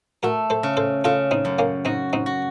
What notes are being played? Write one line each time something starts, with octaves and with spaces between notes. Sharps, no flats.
A3 F#4 A#4
A4 C5
C#3
A4 C5
C#3 F4 A4
C4 D#4
F#2
A#3 C#4
C4 D#4 F#4
C4 D#4
F#4